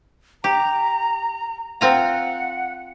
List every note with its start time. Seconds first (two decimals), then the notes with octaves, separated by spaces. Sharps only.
0.44 G4 A#5
1.81 C4 F4 F#5 A#5